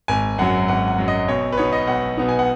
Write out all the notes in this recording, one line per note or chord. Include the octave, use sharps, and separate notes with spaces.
G#1 G#5
F#2 F#3 F#5
G#1 F#5
F#5
F#2 F#3
D#5
B1 C#5
B4
B2 B3 D#4 C#5
D#5
B1 F#5
B2 B3 D#4
G#5
F#5